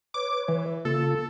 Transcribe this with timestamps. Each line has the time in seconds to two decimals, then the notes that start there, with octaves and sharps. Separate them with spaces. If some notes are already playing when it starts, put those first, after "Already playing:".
0.14 B4 C#5 D6
0.48 E3
0.85 C#3 A#3 F4 A4